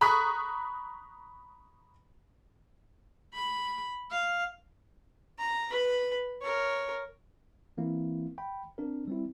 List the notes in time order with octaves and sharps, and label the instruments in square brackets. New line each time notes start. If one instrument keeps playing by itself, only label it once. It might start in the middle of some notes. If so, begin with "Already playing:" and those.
[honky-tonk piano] A#5 B5 C#6 D#6 F#6 B6
[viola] B5
F5
[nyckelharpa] A#5
B4 B5
A#4 C#5
[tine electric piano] E3 A#3 C4 E4
G5 B5
C4 D4 A#4
G3 C4 E4